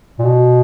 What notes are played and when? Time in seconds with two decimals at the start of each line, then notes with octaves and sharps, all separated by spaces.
0.19 A#2
0.25 B2